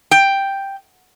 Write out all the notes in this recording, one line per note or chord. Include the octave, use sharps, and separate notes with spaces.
G5